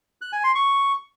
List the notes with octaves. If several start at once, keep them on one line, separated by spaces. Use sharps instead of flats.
F#6
G#5
C6
C#6